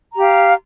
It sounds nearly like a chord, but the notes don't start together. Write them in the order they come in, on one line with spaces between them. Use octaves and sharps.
A#5 G4 F5